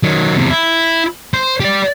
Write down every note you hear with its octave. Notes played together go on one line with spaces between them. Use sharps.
D#3 F#3
E2 C3
E4
C5
G4 D5